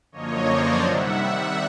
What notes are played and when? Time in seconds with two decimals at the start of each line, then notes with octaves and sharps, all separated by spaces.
0.12 F#2 D3 F3 A#3 C#5 D#5
0.46 C5 D5
0.81 C3 D#3 G3 E5 F#5